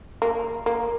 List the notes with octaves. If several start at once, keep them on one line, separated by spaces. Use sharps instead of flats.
A#3
A#3